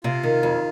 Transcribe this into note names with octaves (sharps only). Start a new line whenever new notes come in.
C3 F4
D#3
F2